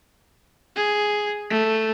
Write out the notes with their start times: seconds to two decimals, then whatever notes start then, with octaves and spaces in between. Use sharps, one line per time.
0.76 G#4
1.51 A3